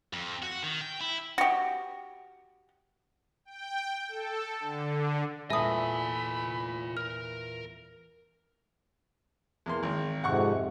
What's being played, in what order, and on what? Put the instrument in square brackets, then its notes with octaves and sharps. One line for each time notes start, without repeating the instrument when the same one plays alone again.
[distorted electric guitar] F2
F#4
D#3
G5
E4
[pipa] F#4 G4
[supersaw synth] G5
A4
D3
[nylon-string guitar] E2 A#2 A4 [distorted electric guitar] F4 G#5 [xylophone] E5 D#6 [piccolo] B5
[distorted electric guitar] A#4 [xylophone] F6
[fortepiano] E2 A#3 C6
G#1
[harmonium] F2 G#2 C3 [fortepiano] F#5 C#6